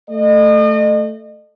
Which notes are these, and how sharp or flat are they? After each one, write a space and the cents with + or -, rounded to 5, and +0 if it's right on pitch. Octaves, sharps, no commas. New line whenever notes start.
A3 +0 D#5 -35